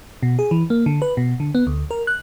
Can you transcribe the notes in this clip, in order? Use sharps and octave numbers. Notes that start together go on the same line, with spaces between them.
B2
G#4
E3
A#3
D3
B4
B2
D3
B3
D2
A#4
F#6